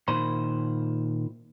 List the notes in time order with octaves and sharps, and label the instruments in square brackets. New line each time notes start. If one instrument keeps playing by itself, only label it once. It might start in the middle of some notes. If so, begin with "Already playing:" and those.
[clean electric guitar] A#2 D#3 C5 B5 C6